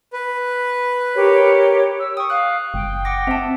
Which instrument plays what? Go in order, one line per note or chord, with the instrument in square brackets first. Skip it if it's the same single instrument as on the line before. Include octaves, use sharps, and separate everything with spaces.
[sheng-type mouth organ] B4
[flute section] G4 A#4 C#5
[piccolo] E6
[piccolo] G5 [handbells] C#6 D#6
[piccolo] F5 [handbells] D#6 F#6
[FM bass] F#1 [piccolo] G5
[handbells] F#5 D6 A#6
[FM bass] C4 [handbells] E5 A5